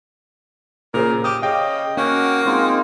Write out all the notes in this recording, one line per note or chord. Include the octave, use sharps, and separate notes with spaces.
A#2 C#3 A#4 C5
G4 D6 D#6
C#3 D#5 F5 G5
A#3 C#4 F#4 F#5 G5
G#3 C4 D#4 F4